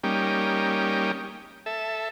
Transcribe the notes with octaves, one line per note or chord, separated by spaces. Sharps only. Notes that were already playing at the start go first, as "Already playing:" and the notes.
G3 A#3 C#4 D#4 G4
A4 E5